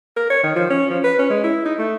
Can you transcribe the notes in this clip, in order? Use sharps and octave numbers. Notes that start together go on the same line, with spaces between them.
A#4
C#5
D#3
F3
C#4
F3
B4
C#4
G#3
E4
D#4
A3